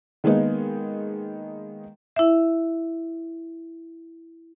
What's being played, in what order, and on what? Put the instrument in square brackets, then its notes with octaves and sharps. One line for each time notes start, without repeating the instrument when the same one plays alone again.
[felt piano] D#3 G#3 A#3 B3 D#4
[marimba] E4 E5